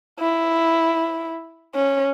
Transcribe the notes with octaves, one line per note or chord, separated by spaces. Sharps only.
E4
C#4